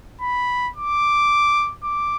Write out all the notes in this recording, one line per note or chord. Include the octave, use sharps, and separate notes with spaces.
B5
D6
D6